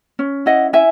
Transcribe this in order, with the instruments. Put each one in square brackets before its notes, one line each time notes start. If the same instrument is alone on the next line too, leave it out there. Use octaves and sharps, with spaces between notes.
[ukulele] C#4
E4 D#5 F#5
E4 E5 G#5